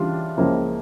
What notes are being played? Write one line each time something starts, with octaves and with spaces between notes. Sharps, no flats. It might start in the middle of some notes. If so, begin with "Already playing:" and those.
Already playing: C#3 E3 G3 D4 F4
C#2 C#3 F3 A#3 E4